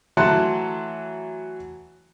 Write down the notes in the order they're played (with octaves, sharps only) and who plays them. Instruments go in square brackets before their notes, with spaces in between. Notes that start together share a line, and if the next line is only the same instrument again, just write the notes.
[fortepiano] E3 F#3 A3 F#5 A5 C6